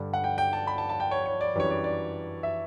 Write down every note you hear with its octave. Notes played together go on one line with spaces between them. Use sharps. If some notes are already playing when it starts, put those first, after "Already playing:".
Already playing: G2 D3 G3
F#5
G5
G5
A5
B5
A5
A5
G5
C#5
C#5
D5
F#2 E3 G3 D4 C#5
D5
D5
E5